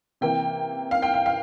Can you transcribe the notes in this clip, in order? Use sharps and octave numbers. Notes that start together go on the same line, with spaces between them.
C3 E3 A#3 G5
F5
G5
F5
F5